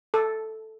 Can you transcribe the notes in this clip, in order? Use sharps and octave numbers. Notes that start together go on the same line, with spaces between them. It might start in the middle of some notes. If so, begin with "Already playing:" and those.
A4